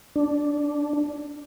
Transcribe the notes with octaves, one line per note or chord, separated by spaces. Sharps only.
D4